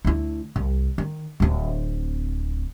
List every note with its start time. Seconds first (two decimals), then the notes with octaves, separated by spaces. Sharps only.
0.05 D2 E4
0.56 C2
0.98 D#3
1.40 D1 C4